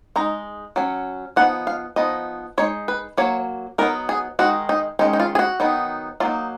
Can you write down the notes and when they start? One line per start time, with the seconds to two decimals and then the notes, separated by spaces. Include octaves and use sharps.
0.16 G#3 D#4 A#5
0.76 F#3 C#4
1.36 F3 B3 D#4 F#5
1.67 F5
1.96 F3 B3 D#4 D#5
2.58 G#3 D#4 C#5
2.88 B4
3.17 F#3 A#3 C#5
3.78 F#3 B3 D#4 A#4
4.09 G#4
4.39 D#3 G#3 D#4 F#4
4.69 D#4
4.99 D#3 G#3 C#4 D#4
5.13 D#4
5.20 F4
5.35 G#4
5.39 F#4
5.60 D#3 F#3 B3 D#4
6.20 F#3 A#3 D#4 F4